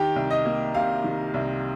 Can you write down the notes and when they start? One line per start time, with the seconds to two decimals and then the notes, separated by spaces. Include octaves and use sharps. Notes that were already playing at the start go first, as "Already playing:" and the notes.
Already playing: D#3 G4 G5
0.16 C2
0.31 D#5
0.45 A#3
0.74 C3 F5
1.04 D#3
1.34 C2